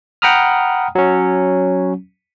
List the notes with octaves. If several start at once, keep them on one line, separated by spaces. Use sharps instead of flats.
F#5 G5 A#5 B5 D#6 F6
F#3 C#4